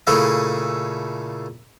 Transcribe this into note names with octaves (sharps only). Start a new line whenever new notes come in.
A#2 C#3 A3 E4 G#4 A4